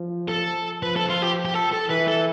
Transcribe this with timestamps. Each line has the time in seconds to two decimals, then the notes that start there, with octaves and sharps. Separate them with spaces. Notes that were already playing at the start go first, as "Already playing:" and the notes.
Already playing: F3
0.29 A4
0.83 F3 B4
0.96 A4
1.10 F4
1.22 G4
1.45 G4
1.54 A4
1.72 A4
1.89 E3 B4
2.08 A4